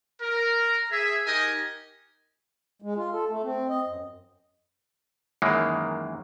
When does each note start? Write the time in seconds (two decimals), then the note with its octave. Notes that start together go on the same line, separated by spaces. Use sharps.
0.22 A#4
0.92 G#4 E5
1.26 D#4 G4 A#4 D#5 G#5
2.82 G#3
2.96 F4
3.12 A4
3.28 A3
3.43 C4
3.69 D#5
3.87 F#2
5.42 F#2 D#3 E3 G#3 A#3